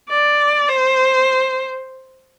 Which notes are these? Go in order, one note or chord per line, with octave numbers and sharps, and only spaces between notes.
D5
C5